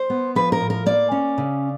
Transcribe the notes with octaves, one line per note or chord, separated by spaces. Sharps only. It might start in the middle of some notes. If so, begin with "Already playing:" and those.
Already playing: C5
B3
F3 B4
A#4
A2
A#4
A#3 D5
C#4
C#3